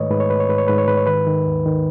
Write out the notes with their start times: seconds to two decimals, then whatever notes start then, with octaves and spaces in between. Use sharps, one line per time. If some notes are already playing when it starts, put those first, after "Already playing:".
Already playing: G#2 D#3 A3 B4 C#5 D#5
0.10 G#2 B4
0.20 C#5
0.30 G#2 B4
0.40 C#5
0.49 G#2 B4
0.58 C#5
0.68 G#2 B4
0.78 C#5
0.88 G#2 B4
0.97 C#5
1.07 D#3 B4
1.27 D#3
1.47 D#2
1.66 D#3